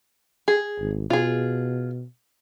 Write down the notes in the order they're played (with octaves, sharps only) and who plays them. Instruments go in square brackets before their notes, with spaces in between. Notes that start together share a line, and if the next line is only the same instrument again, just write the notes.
[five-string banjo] G#4
[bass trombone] G#1
[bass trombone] B2 [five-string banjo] F4 G#4